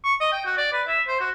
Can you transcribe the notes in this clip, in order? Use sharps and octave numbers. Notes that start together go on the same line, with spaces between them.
C#6
D#5
G5
F#4
D5
B4
E5
C5
F#4